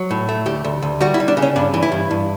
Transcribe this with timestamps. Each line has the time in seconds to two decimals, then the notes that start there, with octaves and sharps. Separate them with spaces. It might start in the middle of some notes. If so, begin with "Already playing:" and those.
Already playing: F#3
0.11 A2
0.29 A3
0.46 D2 G4
0.64 D2
0.83 D2
1.01 G3 F#4
1.14 E4
1.20 G3
1.28 D4
1.37 C#3
1.42 C#4
1.56 G2 D4
1.74 E3
1.83 E4
1.92 G2
2.11 G2